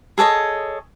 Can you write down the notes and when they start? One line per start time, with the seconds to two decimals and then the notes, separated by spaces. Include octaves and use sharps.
0.18 G#4 A4 C#5 D#5